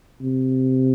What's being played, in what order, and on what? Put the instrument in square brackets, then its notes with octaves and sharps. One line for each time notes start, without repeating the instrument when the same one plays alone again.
[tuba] C3